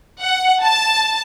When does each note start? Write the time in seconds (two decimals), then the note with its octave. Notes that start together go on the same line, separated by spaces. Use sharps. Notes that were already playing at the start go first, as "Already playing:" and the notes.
0.21 F#5
0.63 A5